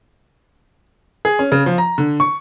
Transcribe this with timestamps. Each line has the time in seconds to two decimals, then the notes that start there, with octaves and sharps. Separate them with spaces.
1.25 G#4
1.39 C#4
1.52 C#3
1.66 F3
1.78 A#5
1.98 D3
2.20 C#6